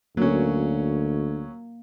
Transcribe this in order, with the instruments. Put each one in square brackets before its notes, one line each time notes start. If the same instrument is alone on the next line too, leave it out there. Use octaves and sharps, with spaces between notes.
[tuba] D2 [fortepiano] F#3 C#4 [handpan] A#3